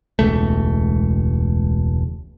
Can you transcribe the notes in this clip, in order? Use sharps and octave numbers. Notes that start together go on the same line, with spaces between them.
E1 C#2 A3